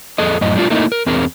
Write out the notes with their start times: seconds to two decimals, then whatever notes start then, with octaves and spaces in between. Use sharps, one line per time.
0.18 F2 G#4 A4 D#5
0.41 F#2 A2 D#5
0.55 G3 A3 D4 F4
0.70 A3 A#3 D#4 E4 A#4 D#5
0.92 A#4
1.06 E2 C4 G#4 A#4